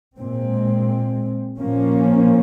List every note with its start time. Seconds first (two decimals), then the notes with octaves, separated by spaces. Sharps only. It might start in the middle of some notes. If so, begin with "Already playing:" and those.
0.18 A#2 G#3 C4
1.59 A#2 F3 A#3 C#4